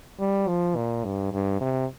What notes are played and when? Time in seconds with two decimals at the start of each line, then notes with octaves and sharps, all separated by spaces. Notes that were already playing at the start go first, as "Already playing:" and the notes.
0.20 G3
0.48 F3
0.76 A#2
1.05 G2
1.33 G2
1.61 C3